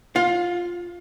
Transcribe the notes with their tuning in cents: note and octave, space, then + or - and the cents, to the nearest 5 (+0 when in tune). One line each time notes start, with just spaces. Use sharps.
F4 +0 F5 +25